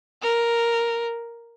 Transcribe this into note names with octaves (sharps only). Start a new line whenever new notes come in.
A#4